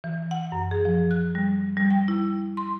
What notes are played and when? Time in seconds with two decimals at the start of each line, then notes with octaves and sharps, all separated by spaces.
0.04 E3
0.31 F#5
0.52 F#2
0.71 G#4
0.85 F3
1.11 F#6
1.35 G3
1.77 G3
1.90 G5
2.08 E4
2.57 C6